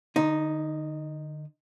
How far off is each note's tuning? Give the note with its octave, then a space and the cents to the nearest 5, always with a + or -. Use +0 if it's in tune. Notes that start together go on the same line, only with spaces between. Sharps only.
D3 +35 D#4 +0